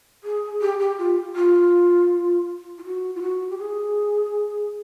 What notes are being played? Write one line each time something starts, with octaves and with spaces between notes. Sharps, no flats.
G#4
G4
G4
F4
F4
F4
F#4
F4
F#4
G4
G#4